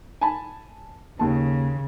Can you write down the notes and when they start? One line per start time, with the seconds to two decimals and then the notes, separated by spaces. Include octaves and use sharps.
0.21 G#5 A5 B5
1.19 D#2 C#3 A5